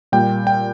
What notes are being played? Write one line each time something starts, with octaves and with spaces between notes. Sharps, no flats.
A#2 G3 G5
G5